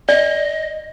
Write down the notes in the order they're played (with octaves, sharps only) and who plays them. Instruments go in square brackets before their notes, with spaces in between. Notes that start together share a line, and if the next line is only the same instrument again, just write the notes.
[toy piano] D5 [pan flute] D#5